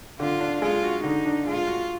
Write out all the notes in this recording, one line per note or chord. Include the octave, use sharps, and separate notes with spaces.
D3 F4
D4
G#3 F4
F#4
D3 D#4
D4
G#3 F4
F#4